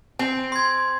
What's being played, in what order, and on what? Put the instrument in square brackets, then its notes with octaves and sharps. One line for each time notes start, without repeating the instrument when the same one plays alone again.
[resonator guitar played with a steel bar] C4 [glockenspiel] G#5
[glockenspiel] C6 G#6